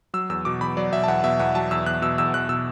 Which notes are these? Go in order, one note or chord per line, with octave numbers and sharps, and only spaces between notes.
F#3 E6
E2 E6
B2 D6
E2 B5
F#3 D5
B2 E5
A5
E2 F#5
B2 E5
E2 F#5
F#3 A5
E2 E6
E2 F#6
B2 E6
E2 E6
E2 F#6
B2 E6